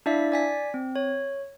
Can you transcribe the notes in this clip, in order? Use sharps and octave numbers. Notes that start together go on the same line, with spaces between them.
D4 E4 D5 E5 F5 B6
D5 G#5 B6
C4
C#5